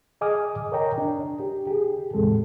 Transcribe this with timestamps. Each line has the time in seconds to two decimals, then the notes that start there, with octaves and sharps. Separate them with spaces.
0.21 G#4 D#5 G#5 D6 D#6 F6
0.72 A#4 C#5 D#5 G5 A#5
0.98 D4
1.40 G4
1.67 G4 G#4
2.14 E2 A2 C3 G#3 A4